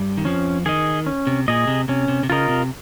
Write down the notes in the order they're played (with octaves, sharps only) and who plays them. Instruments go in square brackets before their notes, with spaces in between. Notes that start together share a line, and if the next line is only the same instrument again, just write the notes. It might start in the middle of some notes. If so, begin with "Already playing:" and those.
Already playing: [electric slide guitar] G2 G3
D#3
[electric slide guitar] F2 F3 [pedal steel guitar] C#4
[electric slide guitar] D#3 [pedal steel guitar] G#4 D#5
[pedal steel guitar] C#4
[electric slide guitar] C3
[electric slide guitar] A#2 [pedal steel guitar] G#4 D#5
[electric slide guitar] C3
[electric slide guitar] C3 [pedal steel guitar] C#4
[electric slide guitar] C3
C3
[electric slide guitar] C#3 [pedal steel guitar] F4 A#4 D#5
[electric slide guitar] C3